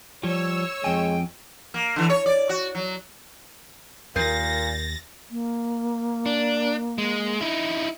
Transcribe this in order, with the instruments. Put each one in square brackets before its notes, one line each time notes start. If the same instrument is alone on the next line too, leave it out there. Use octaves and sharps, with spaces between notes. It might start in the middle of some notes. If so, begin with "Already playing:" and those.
[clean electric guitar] F3 G3 [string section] C#5 E6
[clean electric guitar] F2 G#5 [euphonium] G#3 [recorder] G5
[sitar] A#3
D3 E3
C#5
D5
F#4
F#3
[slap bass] D#2 [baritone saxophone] A#2 [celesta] A#4 G6 C7 [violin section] A6 A#6
[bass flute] A#3
[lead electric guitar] D4
G#3
D#4 E4